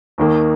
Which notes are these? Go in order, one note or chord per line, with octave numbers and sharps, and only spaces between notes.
D#2 D#3 A#3